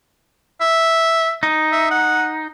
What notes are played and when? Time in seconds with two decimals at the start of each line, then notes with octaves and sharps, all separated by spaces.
0.61 E5
1.43 D#4
1.72 E5
1.91 F#5